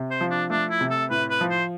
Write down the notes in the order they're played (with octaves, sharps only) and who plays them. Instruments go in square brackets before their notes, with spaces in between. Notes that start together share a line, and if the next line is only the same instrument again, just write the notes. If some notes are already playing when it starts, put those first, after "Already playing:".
Already playing: [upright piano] C3
[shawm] C5
[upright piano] F3
[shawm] D4
[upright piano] A3 [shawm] D4
[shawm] E4
[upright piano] C3
[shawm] A4
[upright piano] A2 [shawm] B4
[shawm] B4
[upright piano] F3
[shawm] C5